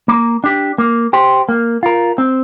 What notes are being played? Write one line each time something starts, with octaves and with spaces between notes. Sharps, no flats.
A#3
D4 G4
A#3
G4 C5
A#3
F4 A#4
C4